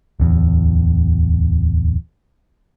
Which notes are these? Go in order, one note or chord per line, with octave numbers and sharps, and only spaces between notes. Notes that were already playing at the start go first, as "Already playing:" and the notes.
D1 E2